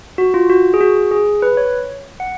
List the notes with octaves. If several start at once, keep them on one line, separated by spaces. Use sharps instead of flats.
F#4
F4
F#4
G#4
F#4
G#4
B4
C#5
F#5